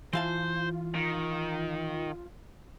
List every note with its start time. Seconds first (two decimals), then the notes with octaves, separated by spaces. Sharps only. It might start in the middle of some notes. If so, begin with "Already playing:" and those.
0.13 E3 F4 C5 F5 A5
0.95 D#3